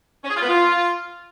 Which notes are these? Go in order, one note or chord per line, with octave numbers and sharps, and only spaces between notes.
C#4
G#4
F4
B3
F4